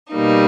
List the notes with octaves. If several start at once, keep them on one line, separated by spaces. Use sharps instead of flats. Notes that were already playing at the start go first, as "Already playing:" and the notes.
B2 G3 A#3 D#4